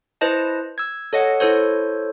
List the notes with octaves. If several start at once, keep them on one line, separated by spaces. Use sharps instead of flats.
E4 B4 C5 D#5 A5
E6 G#6
A4 C#5 D#5 F#5
E4 A4 C5 C#5